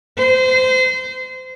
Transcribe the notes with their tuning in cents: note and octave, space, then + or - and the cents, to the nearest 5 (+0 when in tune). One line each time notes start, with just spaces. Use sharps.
C5 -25